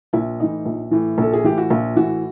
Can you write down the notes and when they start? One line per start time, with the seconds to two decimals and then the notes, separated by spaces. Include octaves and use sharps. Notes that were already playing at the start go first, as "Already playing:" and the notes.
0.13 A#1 E4
0.39 A2 E3 D#4
0.65 A#1
0.91 A2 E3
1.18 A#1 A4
1.33 G#4
1.44 A2 E3 G4
1.58 F#4
1.70 A#1 F4
1.96 A2 E3 F#4